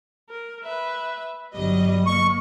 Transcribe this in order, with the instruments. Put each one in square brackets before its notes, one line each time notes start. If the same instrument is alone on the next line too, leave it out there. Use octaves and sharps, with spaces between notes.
[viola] A#4
B4 E5
[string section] G1 F#3 D#5 [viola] G3
[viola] A#3 [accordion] C#6